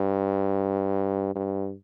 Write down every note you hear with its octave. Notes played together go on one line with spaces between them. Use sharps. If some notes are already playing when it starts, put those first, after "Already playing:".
Already playing: G2
G2